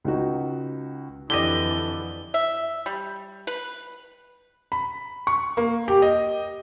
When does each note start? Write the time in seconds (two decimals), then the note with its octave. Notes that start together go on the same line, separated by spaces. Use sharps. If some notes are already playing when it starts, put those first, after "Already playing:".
0.04 C#2 D#4 F#4
1.30 F2 D3 E3 E4 G4 D5 D#5 G7
2.34 E5
2.86 G3
3.47 B4
4.72 B5
5.27 C#6
5.57 A#3
5.88 G4
6.02 D#5